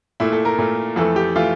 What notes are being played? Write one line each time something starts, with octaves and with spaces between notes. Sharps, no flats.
A#2 A3 E4
A4
A#4
A#2 A3
F2 E3 A3 A4
G4
E3 A3 F4